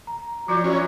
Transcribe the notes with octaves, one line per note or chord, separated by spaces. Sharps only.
A#5
F3 F#3 F4 D5 A#5 G6
E3 F#3 C#4